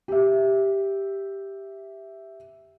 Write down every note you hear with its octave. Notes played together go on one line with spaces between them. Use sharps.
G4 E5